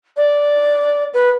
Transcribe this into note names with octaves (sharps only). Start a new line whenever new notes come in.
D5
B4